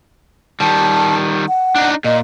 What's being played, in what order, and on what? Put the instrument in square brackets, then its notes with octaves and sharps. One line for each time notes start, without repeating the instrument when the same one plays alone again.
[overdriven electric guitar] D#3 G3 [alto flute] A5
[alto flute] F#5
[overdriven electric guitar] D4 D#4
[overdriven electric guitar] A#2 [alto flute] D#5